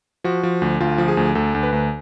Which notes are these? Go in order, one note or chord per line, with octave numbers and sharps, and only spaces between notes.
F3 F#4
F3
D2
D2 F4
F3
G#4
D2
D2 A4
D2
B4
D2